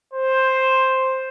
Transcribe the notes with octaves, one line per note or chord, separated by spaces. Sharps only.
C5